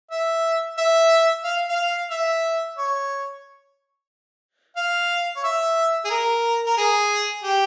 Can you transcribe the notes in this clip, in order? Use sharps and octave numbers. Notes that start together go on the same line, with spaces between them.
E5
E5
F5
F5
E5
C#5
F5
C#5
E5
G#4
A#4
A#4
G#4
G4